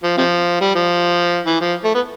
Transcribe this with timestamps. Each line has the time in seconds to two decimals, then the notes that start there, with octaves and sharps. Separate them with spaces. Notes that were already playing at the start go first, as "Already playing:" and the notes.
0.03 F3
0.17 C3 F3
0.61 G3
0.75 F3
1.46 E3
1.61 F3
1.84 A3
1.94 B3